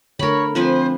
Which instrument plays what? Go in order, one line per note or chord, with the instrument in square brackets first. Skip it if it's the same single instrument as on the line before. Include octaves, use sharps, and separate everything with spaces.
[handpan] D3 A3 [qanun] A#4 B5 [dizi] C#5
[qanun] F3 B4 G#5 [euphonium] C4 [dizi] C5